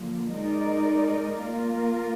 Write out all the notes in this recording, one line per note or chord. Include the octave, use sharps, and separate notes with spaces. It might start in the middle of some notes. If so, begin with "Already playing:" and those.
Already playing: D3 F3 A#3
G#3 D#4 A#4 D5
A#3 F4 A#4